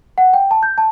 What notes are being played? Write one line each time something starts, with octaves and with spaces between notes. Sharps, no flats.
F#5
G5
A5
G6
A5